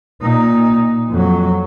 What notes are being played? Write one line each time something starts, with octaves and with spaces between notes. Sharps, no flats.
A#2 D#4
F2 F#3